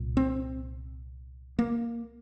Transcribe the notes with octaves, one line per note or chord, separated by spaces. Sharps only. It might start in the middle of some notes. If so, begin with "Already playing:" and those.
Already playing: C2 A#2
C4
A#3